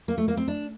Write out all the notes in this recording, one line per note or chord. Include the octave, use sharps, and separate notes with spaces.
A#3
A3
A#3
C4
D4